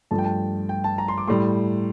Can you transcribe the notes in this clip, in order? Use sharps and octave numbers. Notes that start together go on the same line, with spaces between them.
G2 F3 A3 A5
G5
A5
G5
A5
A#5
C6
D6
A2 G3 C6